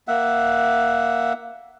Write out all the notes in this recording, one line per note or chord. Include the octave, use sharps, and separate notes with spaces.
A#3 E5 F#5